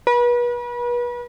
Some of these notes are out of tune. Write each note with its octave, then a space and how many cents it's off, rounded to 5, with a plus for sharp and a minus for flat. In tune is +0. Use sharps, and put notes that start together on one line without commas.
B4 -35